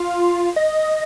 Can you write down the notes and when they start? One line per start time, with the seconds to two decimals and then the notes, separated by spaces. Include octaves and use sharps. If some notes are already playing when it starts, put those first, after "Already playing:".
Already playing: F4
0.56 D#5